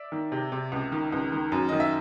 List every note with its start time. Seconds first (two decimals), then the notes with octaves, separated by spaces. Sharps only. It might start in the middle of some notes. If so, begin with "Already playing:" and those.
Already playing: D5 E5
0.12 D#3
0.32 C3
0.52 C3
0.72 C#2
0.92 D#3
1.12 C#2
1.32 D#3
1.52 F#2
1.69 D#3 D#5
1.80 E5